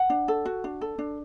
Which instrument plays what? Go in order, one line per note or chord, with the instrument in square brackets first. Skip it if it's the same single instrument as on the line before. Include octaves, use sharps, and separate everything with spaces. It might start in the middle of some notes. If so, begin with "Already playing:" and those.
Already playing: [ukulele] F#5
D4
A4
F#4
D4
A4
D4